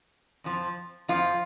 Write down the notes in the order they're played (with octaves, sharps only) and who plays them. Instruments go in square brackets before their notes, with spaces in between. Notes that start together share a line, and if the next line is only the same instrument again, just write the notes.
[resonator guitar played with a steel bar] F2 F3
F2 F3 F4